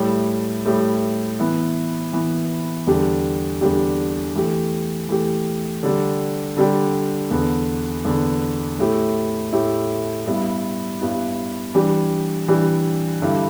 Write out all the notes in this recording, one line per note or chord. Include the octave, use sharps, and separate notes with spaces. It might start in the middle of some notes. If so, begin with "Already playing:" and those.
Already playing: A2 G3 E4 G4
A2 G3 E4 G4
E3 B3 E4
E3 B3 E4
E2 D3 G3 D4 G4
E2 D3 G3 D4 G4
E3 A3 G4
E3 A3 G4
D3 G3 D4 G4
D3 G3 D4 G4
E2 D3 B3
E2 D3 B3
A2 A3 E4 G4
A2 A3 E4 G4
G2 G3 B3 E4
G2 G3 B3 E4
E3 G3 D4 G4
E3 G3 D4 G4
G2 D3 G3 E4 G4